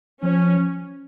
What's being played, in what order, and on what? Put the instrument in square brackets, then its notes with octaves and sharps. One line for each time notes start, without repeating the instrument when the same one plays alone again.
[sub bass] F3 [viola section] C#4